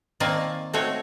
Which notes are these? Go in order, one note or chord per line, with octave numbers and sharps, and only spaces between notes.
D#3 A#3 C4 D5 G#5 A5
A3 C4 D#4 F#4 C#5